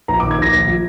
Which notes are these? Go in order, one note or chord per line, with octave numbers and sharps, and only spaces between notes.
A#1 A#5
D6
D#3
G#6
A#1 A#6
A#1
F3